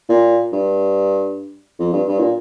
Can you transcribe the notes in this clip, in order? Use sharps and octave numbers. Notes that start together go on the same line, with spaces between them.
A#2
G2
F2
G2
G2
A#2